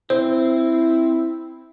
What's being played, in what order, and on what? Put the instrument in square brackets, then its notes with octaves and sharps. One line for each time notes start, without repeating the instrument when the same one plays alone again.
[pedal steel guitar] C4 [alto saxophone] E4 [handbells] C5